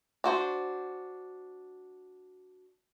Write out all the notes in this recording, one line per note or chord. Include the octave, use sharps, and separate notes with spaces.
D4 F#4 C5